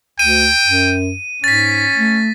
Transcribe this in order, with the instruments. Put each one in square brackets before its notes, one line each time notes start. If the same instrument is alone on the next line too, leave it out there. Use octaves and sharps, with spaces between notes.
[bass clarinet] D2 [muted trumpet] G5 [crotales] D#7
[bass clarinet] F#2
[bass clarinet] G#2 [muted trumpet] C#4 [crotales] A6 B6
[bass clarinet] A3